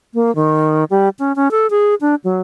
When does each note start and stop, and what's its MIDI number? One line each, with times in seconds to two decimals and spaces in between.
0.14 0.34 58
0.35 0.84 51
0.90 1.09 55
1.19 1.35 61
1.36 1.51 61
1.51 1.70 69
1.70 1.95 68
2.01 2.15 62
2.24 2.42 54